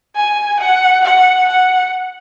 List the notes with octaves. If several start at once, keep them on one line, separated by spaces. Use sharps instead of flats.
G#5
F#5
F#5
F#5